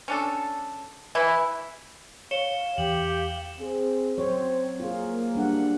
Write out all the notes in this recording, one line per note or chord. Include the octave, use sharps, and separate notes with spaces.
C#4 D4 A4
E3 E4
C#5 F5 C#7 E7 G7
E2 G4 F#7
C4 G#4
F#3 C4 C5 C#5
A#3 F4 G#4
G3 D4 F#5